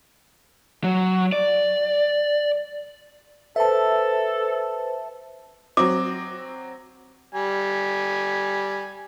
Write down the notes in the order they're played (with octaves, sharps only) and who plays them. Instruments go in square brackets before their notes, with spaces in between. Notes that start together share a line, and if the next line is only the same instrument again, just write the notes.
[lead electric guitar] F#3
D5
[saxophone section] A4 [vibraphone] B4 C5 [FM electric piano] E5 A5
[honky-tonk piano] F#3 C4 [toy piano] D6
[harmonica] G3 G#5